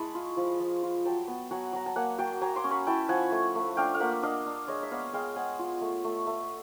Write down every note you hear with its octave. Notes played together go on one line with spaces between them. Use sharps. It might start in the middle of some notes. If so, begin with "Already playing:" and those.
Already playing: G#3 E4 A5 B5 C#6
F4
F3
F3
F4
F#3 G5 A5
B3
F#3 F#5 G#5
F#3 A#5
A5
A#3 F#5 G#5
F#3 G5 A5
F#3 G#5 A#5
C6 D6
C#4
B5 C#6
E4 G5 A5
F3 F#5 G#5
A3
A3
D4 F5 G5
F5
A#3 E5 F#5
D4 D#5 F5
D4
G#3 C#5 D#5
E5
B3 D#5 F5
G#3 F5 G5
G#3 F#5 G#5
F4
A3
A3
A3